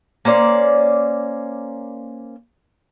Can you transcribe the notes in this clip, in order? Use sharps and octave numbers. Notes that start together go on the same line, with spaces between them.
A#3 C#4 C5 D5